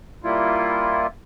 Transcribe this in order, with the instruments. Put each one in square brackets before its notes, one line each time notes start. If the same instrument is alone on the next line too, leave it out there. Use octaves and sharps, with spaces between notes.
[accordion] G3 A#3 E4 F4